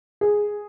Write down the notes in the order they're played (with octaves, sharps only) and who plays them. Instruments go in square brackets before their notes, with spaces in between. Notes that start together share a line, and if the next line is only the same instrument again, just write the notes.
[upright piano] G#4